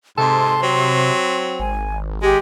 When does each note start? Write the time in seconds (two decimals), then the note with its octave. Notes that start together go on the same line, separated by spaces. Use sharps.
0.18 G#2 C3 A4 C6
0.63 F#3 C4
1.60 G#1 G#5
2.22 G#3 G4